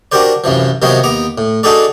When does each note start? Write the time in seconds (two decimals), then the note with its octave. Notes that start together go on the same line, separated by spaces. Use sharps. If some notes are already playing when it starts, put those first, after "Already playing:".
0.12 D4 F#4 G4 A#4 C5 D5
0.44 C2 F#2 E3 F3
0.82 C3 D#3 F3 F#3 B3 C#5
1.04 D#2 B3 A#5 D6
1.38 A2
1.63 D4 D#4 F#4 G#4 A4 D5